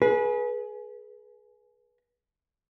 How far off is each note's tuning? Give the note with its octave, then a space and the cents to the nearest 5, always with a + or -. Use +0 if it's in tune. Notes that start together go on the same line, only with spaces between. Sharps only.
G#4 +25 B4 -25